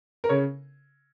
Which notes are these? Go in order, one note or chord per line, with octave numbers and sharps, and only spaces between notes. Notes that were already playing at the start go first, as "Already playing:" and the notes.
A#4
C#3 C#5